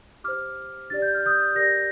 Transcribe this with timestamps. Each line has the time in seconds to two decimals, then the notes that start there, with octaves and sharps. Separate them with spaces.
0.24 G4 C5 D6 F6
0.90 D4 G4 D5 A6
1.02 G6
1.14 F6
1.26 D#6 G6
1.55 G4 A#4 D5 G6 A#6